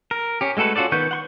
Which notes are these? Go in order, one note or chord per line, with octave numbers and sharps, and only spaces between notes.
A#4
C#4 G4
G#3 A3 F#4 A4 B4
C#4 F4 F#4 A4 D5
D#3 B3 B4 C#6 G6
F#5 C6 C#6